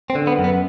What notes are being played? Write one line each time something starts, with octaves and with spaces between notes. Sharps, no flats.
C4
D3
B3
F#2
B3